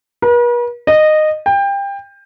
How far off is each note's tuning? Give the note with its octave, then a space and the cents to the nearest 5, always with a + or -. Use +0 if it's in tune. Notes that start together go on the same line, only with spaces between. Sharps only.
B4 -45
D#5 -15
G5 +25